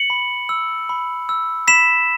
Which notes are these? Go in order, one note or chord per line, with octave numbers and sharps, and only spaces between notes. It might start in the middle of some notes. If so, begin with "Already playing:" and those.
Already playing: C#7 F#7
B5
E6
B5
E6
B5 B6 E7